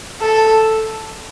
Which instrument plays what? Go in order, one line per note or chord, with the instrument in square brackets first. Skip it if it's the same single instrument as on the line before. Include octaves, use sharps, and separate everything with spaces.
[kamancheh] A4